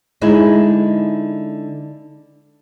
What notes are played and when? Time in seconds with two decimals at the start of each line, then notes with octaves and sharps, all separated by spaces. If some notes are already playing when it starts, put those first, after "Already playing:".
0.21 D3 G#3 D#4 E4